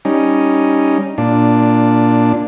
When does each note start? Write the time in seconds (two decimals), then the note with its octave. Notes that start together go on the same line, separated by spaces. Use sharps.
0.05 G3 C#4 D#4
1.18 A#2 D4